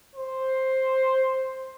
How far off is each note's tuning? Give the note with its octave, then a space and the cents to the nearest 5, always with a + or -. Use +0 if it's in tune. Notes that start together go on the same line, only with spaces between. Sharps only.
C5 +5